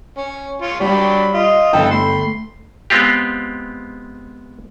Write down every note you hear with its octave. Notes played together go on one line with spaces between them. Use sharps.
C#4
F4 C#5
F#3 G3 D4 G4 B5
F4 D#5
G1 E3 A4 G5
A3 B5 C6
G#3 B3 C4 F4 G4